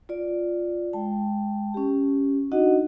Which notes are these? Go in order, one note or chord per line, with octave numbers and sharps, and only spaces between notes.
F4 D5
G#3 G5 A5
C#4 G4
D4 D#4 F#4 D#5 F#5